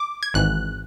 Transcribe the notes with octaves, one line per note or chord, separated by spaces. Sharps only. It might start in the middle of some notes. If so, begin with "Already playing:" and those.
Already playing: D6
G#6
G#1 G#2 E3 F#6